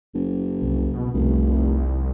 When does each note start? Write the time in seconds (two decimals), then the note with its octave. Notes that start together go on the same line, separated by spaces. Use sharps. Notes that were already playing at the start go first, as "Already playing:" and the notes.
0.14 F#1
0.62 C2
0.94 B2
1.14 F1 C2